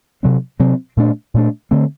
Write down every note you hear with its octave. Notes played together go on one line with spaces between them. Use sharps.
C3 F#3 C4
C3 F#3 C4
A#2 A3 D4
A#2 A3 D4
D3 A3 C4